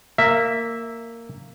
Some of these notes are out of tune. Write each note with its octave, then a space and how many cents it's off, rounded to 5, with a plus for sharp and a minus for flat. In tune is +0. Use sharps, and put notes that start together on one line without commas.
A#3 -15 E5 +0